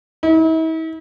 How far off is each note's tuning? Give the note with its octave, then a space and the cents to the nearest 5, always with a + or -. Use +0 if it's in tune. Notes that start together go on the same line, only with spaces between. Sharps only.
E4 -45